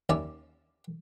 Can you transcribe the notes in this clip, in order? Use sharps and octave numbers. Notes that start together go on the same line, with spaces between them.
D#2 C#4 E4 D5